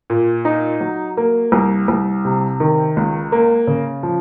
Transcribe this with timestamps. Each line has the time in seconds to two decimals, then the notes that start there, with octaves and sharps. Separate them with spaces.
0.10 A#2
0.45 D#4
0.80 F#3
1.17 A#3
1.52 C2
1.88 C2
2.25 C3
2.60 D#3
2.97 C#2
3.32 A#3
3.67 C#3
4.03 F3